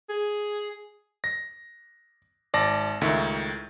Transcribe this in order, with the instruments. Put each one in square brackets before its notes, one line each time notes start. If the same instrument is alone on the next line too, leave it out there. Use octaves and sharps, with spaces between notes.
[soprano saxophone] G#4
[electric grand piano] A#6
G#1 D5 A5 A#6
C#2 A2 D#3 E5